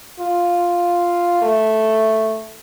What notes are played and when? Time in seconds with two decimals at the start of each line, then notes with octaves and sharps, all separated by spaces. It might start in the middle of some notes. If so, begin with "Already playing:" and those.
0.20 F4
1.42 A3